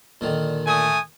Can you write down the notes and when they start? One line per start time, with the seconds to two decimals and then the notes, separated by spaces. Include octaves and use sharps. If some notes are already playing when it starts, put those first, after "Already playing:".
0.21 A#2 D3 D#3
0.67 A3 G#5 D#6